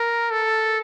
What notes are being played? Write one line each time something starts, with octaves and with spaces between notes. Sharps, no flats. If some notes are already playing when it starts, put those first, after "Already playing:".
Already playing: A#4
A4